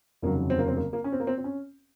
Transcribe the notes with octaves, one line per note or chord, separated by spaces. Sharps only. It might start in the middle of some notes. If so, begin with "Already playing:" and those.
F1 D#2 C#3 F#3 A#3
C4
A#3
C4
A#3
A#3
C#4
C4
A#3
C4
C4
C#4